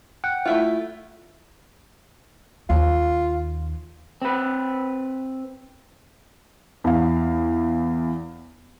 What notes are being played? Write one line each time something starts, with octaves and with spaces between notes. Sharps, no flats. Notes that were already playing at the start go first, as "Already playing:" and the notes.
F#5 G5
A3 E4 F4
D#2 F4
C4 B4
E2 F5